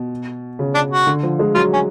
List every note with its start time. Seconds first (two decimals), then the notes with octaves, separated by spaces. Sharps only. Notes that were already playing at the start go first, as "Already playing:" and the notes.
Already playing: B2
0.59 C#3
0.75 D4
0.91 F#4
1.07 D3
1.23 F3
1.39 G#3
1.54 F#3 F4
1.73 C#4